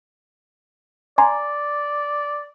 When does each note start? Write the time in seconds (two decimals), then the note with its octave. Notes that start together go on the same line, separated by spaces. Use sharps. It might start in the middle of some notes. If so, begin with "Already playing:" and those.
1.18 D5 G#5 A#5 C6